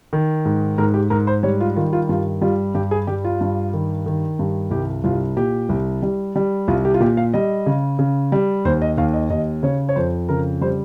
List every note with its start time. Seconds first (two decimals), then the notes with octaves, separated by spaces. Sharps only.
0.13 D#3
0.45 G#2
0.78 G#2 A#4
0.94 G4
1.10 G#2 A#4
1.27 C5
1.43 G3 C#5
1.61 F4
1.76 D#3 F4
1.93 F4
2.09 G2 F4
2.41 G3 F4
2.75 G2 G4
2.91 G#4
3.07 G3 G4
3.25 F4
3.41 G2
3.73 D#3
4.06 D#3
4.39 G2
4.71 C2 G4
5.04 C2 F4
5.36 A#2 G4
5.69 C2
6.03 G3
6.36 G3
6.68 C2 F4
6.85 G4
6.94 F4
7.00 A#2 G4
7.17 F5
7.34 G3 D#5
7.66 C#3
7.99 C#3
8.32 G3
8.65 D#2 C5
8.82 D#5
8.98 D#2 F5
9.14 D#5
9.30 D#2 D#5
9.63 C#3 C#5
9.89 C#5
9.96 F2 C5
10.29 C#3 A#4
10.61 G3 C5